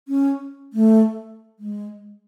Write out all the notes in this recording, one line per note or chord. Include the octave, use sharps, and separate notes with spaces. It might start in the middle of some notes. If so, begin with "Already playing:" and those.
C#4
A3
G#3